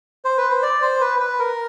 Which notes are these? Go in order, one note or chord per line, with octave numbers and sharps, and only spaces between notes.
C5
B4
C5
D5
C5
B4
B4
A#4